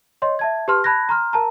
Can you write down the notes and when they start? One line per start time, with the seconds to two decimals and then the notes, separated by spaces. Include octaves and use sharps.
0.22 C#5 D#5 C6
0.39 E5 A5 G#6
0.68 G4 B4 A5 C6 F6
0.84 A5 B5 F#6 G#6 A#6
1.09 A#5 C6 F6
1.33 A#4 A5 A#5